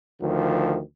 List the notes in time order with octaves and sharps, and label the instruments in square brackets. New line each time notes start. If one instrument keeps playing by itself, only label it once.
[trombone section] D2 D#3 F3